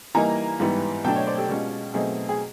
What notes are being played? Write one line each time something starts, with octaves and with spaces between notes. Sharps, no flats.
E3 G3 A#3 D#4 G#5 A#5
G#2 E3 G3 B3
B2 F#3 A3 D4 G5 A5
C#5 D#5
C5 D5
G4 A4
B2 G#3 C#4 F4 G4
B2 F#3 A3 C4 D#4 G#4
G#4